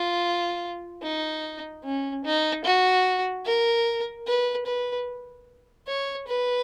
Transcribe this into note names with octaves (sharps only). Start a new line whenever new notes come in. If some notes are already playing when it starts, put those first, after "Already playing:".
Already playing: F4
D#4
C#4
D#4
F#4
A#4
B4
B4
C#5
B4